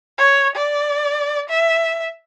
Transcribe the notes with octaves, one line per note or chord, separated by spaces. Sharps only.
C#5
D5
E5